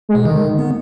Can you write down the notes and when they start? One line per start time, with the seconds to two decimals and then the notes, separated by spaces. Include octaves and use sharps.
0.09 G#3
0.15 B2
0.25 D3 D#3
0.58 B3